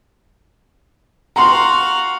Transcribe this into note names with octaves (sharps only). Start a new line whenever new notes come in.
F#4 F5 A#5 C6